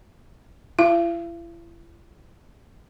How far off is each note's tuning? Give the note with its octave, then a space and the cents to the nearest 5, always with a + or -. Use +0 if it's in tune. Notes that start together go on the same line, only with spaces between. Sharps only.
E4 +40 F5 -45